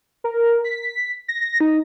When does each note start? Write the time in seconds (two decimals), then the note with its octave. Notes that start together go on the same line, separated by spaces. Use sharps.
0.24 A#4
0.64 B6
1.28 A#6
1.60 D#4